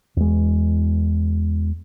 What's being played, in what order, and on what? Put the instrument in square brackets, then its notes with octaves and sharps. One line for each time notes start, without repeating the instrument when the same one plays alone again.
[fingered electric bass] E2 G#3